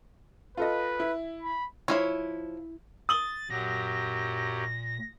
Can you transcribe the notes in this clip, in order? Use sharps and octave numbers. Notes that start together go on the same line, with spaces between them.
F4 A4 B4 D#5
E4
B5
F3 C#4 E4 C#5
D#6 A6 F#7 G7
F#2 A#2 F#3 G4 A#6